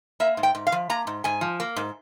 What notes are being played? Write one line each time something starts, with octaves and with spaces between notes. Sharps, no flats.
A#3 E5
G#2
G5
G#2
F5
F3
A#3 A#5
G#2
G#2 G#5
F3
A#3
G#2